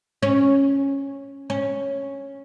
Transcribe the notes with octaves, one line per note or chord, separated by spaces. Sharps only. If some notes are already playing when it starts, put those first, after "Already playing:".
C#4
C#4